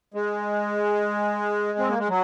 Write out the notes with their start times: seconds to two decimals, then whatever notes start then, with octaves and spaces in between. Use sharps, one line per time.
0.14 G#3
1.79 C4
1.89 A#3
1.99 G#3
2.09 F#3